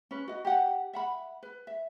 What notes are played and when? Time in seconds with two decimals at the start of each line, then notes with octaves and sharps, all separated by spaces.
0.11 C#4 B4
0.28 F#4 D#5
0.45 G4 F#5
0.93 E5 F#5 B5
1.43 B4
1.67 E5